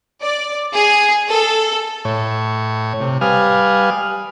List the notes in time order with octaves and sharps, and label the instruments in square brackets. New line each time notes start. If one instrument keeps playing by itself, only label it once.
[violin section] D5
G#4
A4
[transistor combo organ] A2 C#5
C3
G3 B4 F5 G#5 D#6 F6